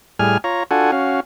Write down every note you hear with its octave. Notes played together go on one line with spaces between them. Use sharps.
A2 G3 G#4 G#5 F6
F4 C#5 A#5
D4 F4 F#4 A4 F#5 G#5
C#4 F#4 F5